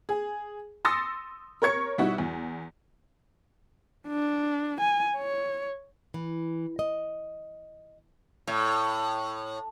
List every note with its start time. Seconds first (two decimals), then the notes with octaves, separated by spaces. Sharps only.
0.09 G#4
0.85 C6 D#6 E6 A6 A#6 C#7
1.62 A#4 C#5 C#6 G#6 C#7
1.98 B2 G3 D#4 E4 F#4
2.18 E2
4.08 D4
4.81 G#5
5.16 C#5
6.14 E3
6.79 D#5
8.47 A2